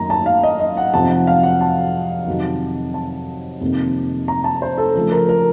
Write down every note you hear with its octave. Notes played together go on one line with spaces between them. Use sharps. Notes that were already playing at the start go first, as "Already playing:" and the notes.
Already playing: F#2 D#3 A#3 D#4 A#5
A5
F5
D#5
D#5
F#5
F2 C3 F3 C4 D#4 A5
F#5
F5
F#5
A5
F2 C3 D#3 F#3
A5
F2 C3 D#3 A#3 D#4
A#5
A5
C5
A4
C#3 F3 A3 A4
A#4
A#4